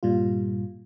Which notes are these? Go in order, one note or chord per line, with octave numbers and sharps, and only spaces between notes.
G2 A#2 G3 F4